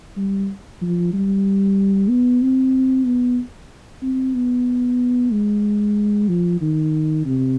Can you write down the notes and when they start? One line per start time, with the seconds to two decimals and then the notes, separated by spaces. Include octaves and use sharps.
0.17 G3
0.81 F3
1.13 G3
2.09 B3
2.42 C4
3.06 B3
4.02 C4
4.35 B3
5.31 G#3
6.28 F3
6.61 D#3
7.25 C3